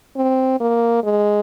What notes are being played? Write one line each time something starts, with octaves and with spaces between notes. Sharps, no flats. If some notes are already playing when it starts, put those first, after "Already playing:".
C4
A#3
G#3